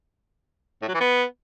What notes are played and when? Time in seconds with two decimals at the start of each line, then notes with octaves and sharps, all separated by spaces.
0.82 A2
0.88 F#3
0.94 E3
1.00 B3